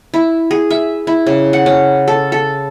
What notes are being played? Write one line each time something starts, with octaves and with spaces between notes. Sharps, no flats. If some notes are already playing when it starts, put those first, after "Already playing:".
E4
G#4
E5
E4
C#3
F#5
C#4
A4
A4